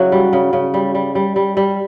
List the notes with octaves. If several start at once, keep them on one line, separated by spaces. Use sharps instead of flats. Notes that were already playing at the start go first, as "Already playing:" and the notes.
Already playing: C#3 F#3 E4 F#4
G3
C#3
C#3
G3
G3
G3
G3
G3